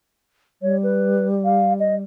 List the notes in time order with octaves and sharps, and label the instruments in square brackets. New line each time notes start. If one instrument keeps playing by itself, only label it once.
[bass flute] G3 [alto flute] C#5
[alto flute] B4
F5
D#5